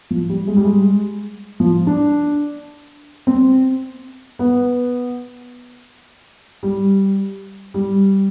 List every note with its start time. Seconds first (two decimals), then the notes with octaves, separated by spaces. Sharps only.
0.11 F3
0.29 G3
0.47 G#3
0.56 G3
0.65 G#3
1.60 F3
1.87 D4
3.27 C4
4.39 B3
6.63 G3
7.74 G3